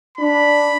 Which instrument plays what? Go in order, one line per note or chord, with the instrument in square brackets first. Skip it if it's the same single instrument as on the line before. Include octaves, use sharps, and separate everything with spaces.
[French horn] D4 [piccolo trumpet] B5